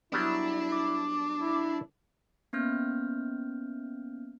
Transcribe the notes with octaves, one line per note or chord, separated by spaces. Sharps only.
F#3 G3 B3 D4 E4
D6
E4
A#3 B3 C#4 F6 G6